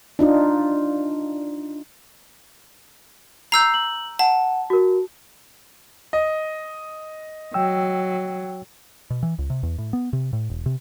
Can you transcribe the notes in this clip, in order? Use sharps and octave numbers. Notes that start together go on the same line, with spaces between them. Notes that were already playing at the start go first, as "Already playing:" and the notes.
D4 D#4 F4
A#5 E6 G6 C7
F#7
F#5 A5
F#4 A#4
D#5
F#3 G5 E6
B2
E3
C#2
C3
E2
A2
B3
C3
A2
E1
C3